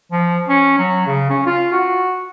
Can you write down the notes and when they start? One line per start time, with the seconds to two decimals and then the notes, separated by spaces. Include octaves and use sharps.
0.12 F3
0.49 C#4
0.78 F#3
1.07 C#3
1.30 C#4
1.46 F4
1.73 F#4